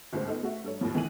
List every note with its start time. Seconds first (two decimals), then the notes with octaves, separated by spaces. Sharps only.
0.13 G1 C#2 G#2 A3 C5
0.28 B3 D#4 A4
0.43 A3 F#4 E5
0.64 G2 A4 C#5
0.81 D#2 A2 F3
0.94 C#2 E3 A3 G#5 D#7 F#7